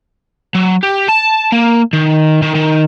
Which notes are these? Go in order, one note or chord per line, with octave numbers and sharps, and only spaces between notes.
F#3
G4
A5
A#3
D#3
D#3
D#3